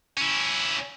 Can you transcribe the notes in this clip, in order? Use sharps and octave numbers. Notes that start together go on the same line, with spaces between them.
C#4 E4